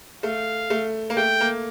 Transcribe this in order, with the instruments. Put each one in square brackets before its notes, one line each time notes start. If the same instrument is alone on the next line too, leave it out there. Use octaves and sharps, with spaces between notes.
[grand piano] A3 [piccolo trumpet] F5
[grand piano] A3
A#3
[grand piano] A3 [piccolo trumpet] G5
[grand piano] A#3